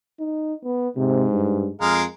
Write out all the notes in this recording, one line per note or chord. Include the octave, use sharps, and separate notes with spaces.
D#4
B3
G#2 C3
G2
F2 G#3 A#4 F5